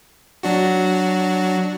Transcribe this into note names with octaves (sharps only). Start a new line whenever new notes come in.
F#3 D4 F#4